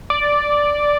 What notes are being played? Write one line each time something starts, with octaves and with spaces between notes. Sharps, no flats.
D5